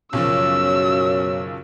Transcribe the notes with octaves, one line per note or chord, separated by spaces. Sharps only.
B1 F#2 C#3 F3 C#4 E6